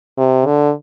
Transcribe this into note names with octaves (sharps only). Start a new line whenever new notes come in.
C3
D3